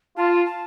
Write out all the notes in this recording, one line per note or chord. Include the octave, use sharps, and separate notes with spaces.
F4 A5
A5